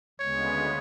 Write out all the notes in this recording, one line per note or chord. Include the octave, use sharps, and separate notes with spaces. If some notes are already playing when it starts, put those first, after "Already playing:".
D2 C#3 G#3 B3 C#5